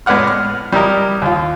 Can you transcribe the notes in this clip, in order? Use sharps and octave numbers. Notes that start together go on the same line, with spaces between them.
A2 G#3 B3 D5 F#5 F6
F6
G3 E4 A#4 D#5
D#2 F4